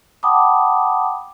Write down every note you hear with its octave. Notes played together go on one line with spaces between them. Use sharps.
F#5 G5 A5 B5 D6 D#6